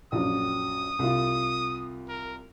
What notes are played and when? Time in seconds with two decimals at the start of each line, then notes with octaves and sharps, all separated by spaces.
0.12 A#1 F#2 D#6
0.99 C2 F4
2.08 A#4